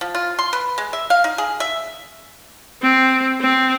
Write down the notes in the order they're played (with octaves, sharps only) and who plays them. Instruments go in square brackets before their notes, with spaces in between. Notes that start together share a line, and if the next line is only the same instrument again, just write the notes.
[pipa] F3
F4
C6
B4
G#3
E5
F5
D#4
G#4
E5
[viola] C4
C4